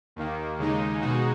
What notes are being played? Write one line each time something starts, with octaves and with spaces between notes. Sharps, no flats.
D#2 D#3 A#3
D#2 C#3 G#3 D#4
B2 G#3 D#4 F#4